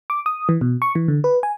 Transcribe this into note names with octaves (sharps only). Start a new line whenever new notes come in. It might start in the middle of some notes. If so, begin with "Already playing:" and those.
D6
D#6
E3
B2
C#6
E3
D3
B4
G#5